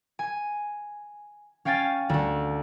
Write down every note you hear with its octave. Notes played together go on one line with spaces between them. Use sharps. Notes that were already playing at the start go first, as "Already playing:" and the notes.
G#5
C#4 F5 G5 G#5 A6
D2 A3